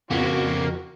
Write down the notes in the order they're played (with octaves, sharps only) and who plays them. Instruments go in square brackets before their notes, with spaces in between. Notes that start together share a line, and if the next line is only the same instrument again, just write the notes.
[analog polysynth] F2 [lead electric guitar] C#3 B3 [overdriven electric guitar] A#3 [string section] F#4